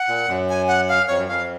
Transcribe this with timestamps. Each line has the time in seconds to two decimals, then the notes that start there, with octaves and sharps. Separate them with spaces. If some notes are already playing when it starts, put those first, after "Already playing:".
Already playing: F#5
0.08 A#2
0.28 F#2
0.49 G#5
0.68 F#5
0.89 F5
1.08 F2 C#5
1.18 F#2
1.28 F2 F5